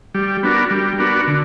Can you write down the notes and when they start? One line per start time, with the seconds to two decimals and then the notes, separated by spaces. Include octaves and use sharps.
0.14 G3
0.43 B3 D4 F#4 A#4
0.71 G3
0.98 B3 D4 F#4 A#4
1.27 D3